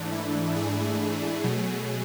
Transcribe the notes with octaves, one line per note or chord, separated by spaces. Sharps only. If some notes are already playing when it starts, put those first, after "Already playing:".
Already playing: G#2 E3 A3 D4
E4
G#4
B2 F#3 A3